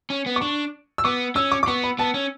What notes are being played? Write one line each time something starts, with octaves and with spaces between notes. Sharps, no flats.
C#4
B3
D6
D4 C#6
E6
B3 D6
C#4 E6
D6
D6
B3 C#6
B5
B3 A5
C#4